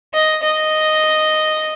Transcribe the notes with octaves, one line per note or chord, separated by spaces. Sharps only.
D#5
D#5